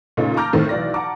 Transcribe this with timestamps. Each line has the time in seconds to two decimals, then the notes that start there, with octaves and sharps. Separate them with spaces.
0.17 A#2 C#3 A3 C#4 D#4
0.36 A5 A#5 D6 F6 G6 A#6
0.53 A2 D#3 A3 C4
0.69 B1 E3 D5 A#6
0.94 F#5 A5 A#5 D6